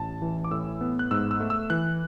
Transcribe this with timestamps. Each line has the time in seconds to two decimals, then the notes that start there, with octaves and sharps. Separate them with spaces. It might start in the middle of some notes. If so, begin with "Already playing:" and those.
Already playing: A1 A5
0.22 E3
0.44 D6
0.51 A2 E6
0.81 B3
0.99 F#6
1.11 G#2 E6
1.31 E6
1.40 A3
1.50 E6
1.70 E3 F#6